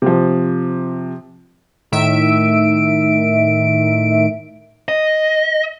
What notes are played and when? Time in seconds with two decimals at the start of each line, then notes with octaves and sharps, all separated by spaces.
0.02 C3 F3
1.92 A2 D#3 E5 D7
4.88 D#5